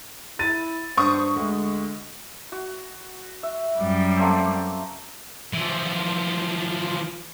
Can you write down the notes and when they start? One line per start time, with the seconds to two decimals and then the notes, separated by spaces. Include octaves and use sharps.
0.39 E4 A6 D#7
0.97 G2 C5 C#6 D#6
1.36 D2 G#3
2.52 F#4
3.43 E5
3.78 F#2 G3
4.17 A3 A#3 C4
5.53 E3 F3